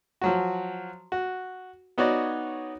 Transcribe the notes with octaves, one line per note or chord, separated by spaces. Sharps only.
F3 F#3 F#4
F#4
B3 D#4 F#4 C#5 D5